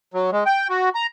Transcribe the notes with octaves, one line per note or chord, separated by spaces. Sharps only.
F#3
G#3
G5
F#4
A#5